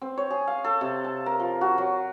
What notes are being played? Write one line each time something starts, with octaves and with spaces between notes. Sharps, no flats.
C4
C#5
G#4
F5
A4
C3
A5
A#4
F3
F#4
F#3